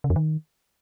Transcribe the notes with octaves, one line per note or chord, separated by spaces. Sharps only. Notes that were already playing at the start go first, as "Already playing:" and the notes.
C#3
F2
D#3